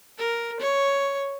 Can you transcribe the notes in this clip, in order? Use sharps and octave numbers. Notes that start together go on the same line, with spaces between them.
A#4
C#5